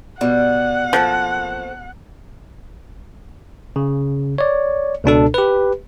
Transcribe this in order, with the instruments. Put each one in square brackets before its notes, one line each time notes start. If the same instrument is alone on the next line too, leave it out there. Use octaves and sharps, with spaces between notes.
[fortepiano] B2 [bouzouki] G3 [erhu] F#5
[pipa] F3 [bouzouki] A3 A#3 C4
[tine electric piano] C#3
C#5 D5
C#2 B2 D4 A4
G4 B4